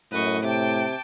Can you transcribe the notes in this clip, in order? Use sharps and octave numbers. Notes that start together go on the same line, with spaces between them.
F#2 A2 B4 D#5 C#6
C3 G5 A5 D6